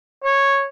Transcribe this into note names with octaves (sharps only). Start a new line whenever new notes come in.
C#5